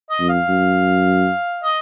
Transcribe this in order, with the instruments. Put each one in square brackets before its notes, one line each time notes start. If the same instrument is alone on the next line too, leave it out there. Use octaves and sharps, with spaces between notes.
[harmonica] D#5
[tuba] F2
[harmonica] F5
[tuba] F#2
[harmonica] D#5